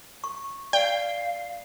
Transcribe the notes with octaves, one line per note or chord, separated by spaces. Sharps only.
C#6
D5 F5 G5